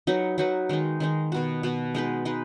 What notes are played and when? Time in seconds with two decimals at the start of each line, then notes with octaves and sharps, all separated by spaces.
0.07 F#3 D#4 F#4 B4
0.38 F#3 D#4 F#4 B4
0.69 D#3 G#3 D#4
1.00 D#3 G#3 D#4
1.32 B2 B3 F#4
1.63 B2 B3 F#4
1.95 G#3 D#4 B4
2.25 G#3 D#4 B4